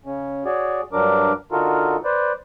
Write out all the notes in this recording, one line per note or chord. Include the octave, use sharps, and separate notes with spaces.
C#3 C#4
F#4 G#4 C#5 D5
G2 F#3 D4 A#4 D6
D3 D#4 F4 F#4 A4 A#4
B4 C5 D5